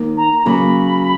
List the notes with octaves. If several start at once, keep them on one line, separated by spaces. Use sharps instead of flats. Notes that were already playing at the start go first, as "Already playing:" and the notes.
Already playing: D#2 D#3 A#3
A#5
A#5
C#3 F#3 A#3 B5